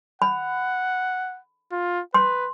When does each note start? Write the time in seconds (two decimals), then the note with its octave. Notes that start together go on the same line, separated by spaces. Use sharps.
0.22 F#5 B5
1.72 F4
2.14 B4 C6